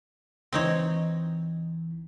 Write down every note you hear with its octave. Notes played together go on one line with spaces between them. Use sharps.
C#2 E3 C4 D#4 C#5